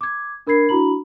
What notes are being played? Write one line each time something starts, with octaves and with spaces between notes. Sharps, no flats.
D6 G#6
D4 A#4 B5 G#6 C7
D4 E4 F#4 A#5 B5 F#7